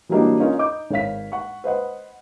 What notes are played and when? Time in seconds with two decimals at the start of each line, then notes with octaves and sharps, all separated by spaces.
0.09 E3 F#3 G3 A#3 D4 D#4
0.40 C#4 D#4 F4 A#4 C#5
0.59 D#4 D6 G6
0.91 G#1 C#5 F5 B6
1.32 F#5 C#6
1.64 B4 C5 D#5 F#5